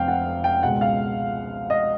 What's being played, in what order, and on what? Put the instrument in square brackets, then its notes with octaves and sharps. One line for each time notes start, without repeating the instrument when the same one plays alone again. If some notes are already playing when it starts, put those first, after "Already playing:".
Already playing: [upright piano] F1 F2 C3 F5 G5
F#5
G5
C#2 B2 G#3 F#5
F5
D#5